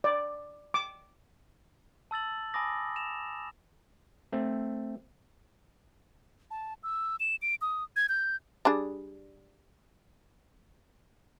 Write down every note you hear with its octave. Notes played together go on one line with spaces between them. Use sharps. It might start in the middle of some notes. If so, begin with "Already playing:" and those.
D5
D6
A5 E6 A6 F#7
G#5 A5 B5 D6 D#6 A#6
E7 F7
A3 C4
A5
E6
E7
D7
D#6
G#6
G6
G3 D4 G#4